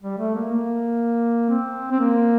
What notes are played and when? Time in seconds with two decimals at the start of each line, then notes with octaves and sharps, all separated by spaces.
0.03 G3
0.18 A3
0.35 A#3
0.51 A#3
1.50 C4
1.91 C4
2.00 A#3